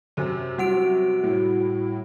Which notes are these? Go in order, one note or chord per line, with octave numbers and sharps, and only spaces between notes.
F#2 C3 C4
G3 F#4 F#5 D7
A2